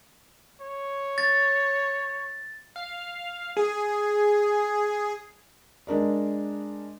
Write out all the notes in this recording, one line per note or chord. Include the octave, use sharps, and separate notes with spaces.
C#5
A6
F5
G#4
G#3 D4 A#4 D5